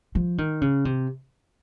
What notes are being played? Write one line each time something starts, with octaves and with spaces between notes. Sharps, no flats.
F3
D#3
C#3
C3